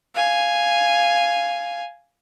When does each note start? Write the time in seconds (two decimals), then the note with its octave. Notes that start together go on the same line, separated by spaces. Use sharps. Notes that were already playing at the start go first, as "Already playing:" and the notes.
0.14 F5 G#5